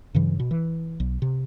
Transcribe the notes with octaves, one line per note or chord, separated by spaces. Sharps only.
G2 C#3 E3 F#3
B2
E3
B1
C3